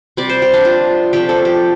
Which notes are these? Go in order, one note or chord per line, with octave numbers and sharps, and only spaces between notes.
C3 G3 D5
C5
G4
D4
F4
C3 F3 A3 G4
A4
G4